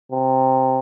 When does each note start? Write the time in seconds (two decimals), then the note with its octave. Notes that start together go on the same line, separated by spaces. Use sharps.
0.12 C3